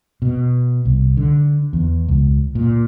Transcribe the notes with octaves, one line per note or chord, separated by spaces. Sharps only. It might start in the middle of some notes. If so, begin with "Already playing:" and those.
B2
C2
D3
E2
C#2
A#2